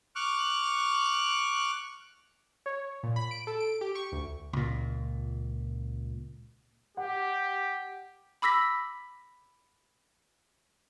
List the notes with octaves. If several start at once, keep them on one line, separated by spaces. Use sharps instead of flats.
C#6 D6 F6 F#6
C#5
A#2
B5
D7
A4
D7
G4
C#6
D2
C#2 A#2
G4 F#5
B5 D6 E6 A#6 B6